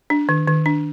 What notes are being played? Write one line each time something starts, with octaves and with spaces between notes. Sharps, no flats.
D4
D#3
D#3
D4